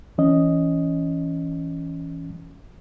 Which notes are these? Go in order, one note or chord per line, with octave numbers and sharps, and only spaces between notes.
E3 C#4 D#5